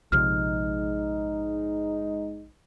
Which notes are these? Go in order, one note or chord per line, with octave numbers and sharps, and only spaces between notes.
A#1 G#2 C3 F3 G#3 D#4 F6